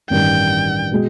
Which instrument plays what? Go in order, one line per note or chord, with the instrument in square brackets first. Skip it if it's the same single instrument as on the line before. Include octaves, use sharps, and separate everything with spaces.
[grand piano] A1 G2 D#3 [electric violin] G5
[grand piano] B2 G#3